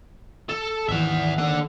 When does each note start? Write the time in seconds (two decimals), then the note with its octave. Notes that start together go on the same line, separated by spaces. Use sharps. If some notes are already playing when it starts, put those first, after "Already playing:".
0.49 A4
0.89 G#1 D#2 E3 E5 F#5
1.38 D3 D#3 A#3 F#5